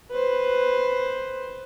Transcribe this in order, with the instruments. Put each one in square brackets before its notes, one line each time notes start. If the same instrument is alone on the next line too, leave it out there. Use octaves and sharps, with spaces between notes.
[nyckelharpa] B4 C5